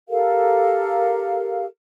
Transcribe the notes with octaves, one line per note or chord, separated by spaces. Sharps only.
G4 A4 A#4 F5